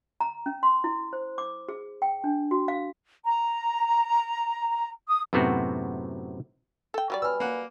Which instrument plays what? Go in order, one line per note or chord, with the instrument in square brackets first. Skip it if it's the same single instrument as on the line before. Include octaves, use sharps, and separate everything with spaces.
[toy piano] A#5
C#4
C6
E4
C5
D6
G#4
G5
D4
F#4
F5
[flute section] A#5
D#6
[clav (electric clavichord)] F#2 A2 C3 B3 C4 F#4
[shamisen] A4 G5
F#3 G3 D5
[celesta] B4 G#5 B5 [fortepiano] E6 F6
[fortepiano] A#3 F#5